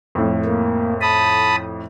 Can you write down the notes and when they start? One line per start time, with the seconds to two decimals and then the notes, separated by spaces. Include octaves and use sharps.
0.15 F2 A2
0.45 A#3
1.01 A5 B5 D#6